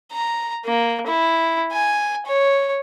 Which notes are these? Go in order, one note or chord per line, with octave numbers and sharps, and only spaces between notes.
A#5
A#3
E4
G#5
C#5